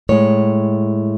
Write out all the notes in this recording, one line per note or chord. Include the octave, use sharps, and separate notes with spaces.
A2 G#3 C#5